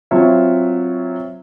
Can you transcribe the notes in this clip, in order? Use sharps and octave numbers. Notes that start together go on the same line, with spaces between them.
F#3 C4 F4 C#5 E5